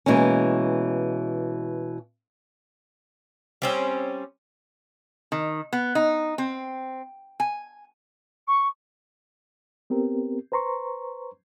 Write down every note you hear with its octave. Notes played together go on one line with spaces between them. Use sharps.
B2 E3 G#3 A#3 C#4
G3 C4 C#4
D#3
B3
D#4
C4
G#5
C#6
B3 C4 G4 A#4
B4 C5 A#5 C6 C#6